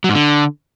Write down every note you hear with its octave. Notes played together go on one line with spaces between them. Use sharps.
F#3
G#2
D3